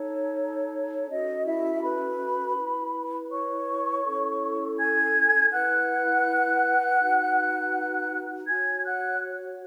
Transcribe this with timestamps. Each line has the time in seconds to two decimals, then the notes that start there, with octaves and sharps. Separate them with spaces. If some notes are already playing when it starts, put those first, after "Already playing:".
Already playing: D#4 A4 C#5
1.09 C#4 F#4 A4 D#5
1.46 E4 E5
1.83 B4 B5
2.57 E4 B4
3.32 C#5 C#6
4.05 C#4 E4 A4
4.79 G#5 G#6
5.52 E4 B4 F#5 F#6
7.00 D#4 F#4 B4
8.48 F#4 C#5 G#5 G#6
8.85 F#5 F#6